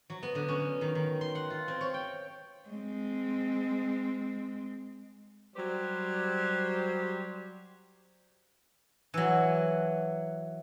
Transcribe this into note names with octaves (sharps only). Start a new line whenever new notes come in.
F#3
B3
D3
C#4
D#3
D#3
C6
F#5
F4
C4
C#5
G5
G#3 C4
F#3 G3 G4 C5
E3 F#3